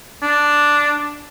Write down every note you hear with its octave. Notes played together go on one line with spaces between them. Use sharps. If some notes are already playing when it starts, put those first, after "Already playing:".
D4